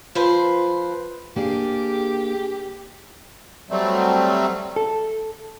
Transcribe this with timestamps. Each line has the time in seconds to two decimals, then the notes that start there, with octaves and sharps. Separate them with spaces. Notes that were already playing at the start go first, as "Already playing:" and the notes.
0.15 F3 B4 C5
1.36 A#3 D4 G4 G#4
3.70 F#3 G3 A3 C4
4.76 A4